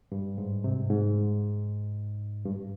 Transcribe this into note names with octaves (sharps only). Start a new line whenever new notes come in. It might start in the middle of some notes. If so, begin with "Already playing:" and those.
G2
G#2
C3
G#2
G2